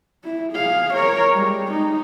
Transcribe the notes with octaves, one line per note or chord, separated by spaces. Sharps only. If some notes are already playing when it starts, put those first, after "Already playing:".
E4
G#4 F5
A#4 C#5
G3 G#3
D#4